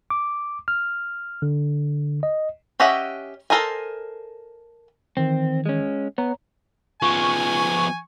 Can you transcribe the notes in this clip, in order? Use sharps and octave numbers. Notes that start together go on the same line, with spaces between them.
D6
F6
D3
D#5
C#4 G4 D#5 E5 F#5
A4 A#4 C5 D#5 G#5
D#3 E3 C4
G#3 C#4
B3 C#5 A#5
F3 B3 G#5 C#6